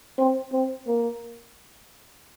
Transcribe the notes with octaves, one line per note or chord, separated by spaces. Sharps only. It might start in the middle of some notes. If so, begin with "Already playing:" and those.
C4
C4
A#3